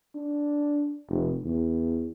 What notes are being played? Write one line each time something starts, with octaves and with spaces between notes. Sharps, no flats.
D4
F1
E2